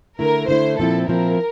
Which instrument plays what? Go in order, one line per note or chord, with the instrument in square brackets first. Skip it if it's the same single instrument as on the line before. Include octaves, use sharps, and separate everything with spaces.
[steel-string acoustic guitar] D3 A3 E4 [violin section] A#4
[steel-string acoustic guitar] D3 A3 E4 [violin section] C5
[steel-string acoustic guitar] A#2 F3 C4 E4 [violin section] A4
[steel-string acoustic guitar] A#2 F3 C4 E4 [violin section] A#4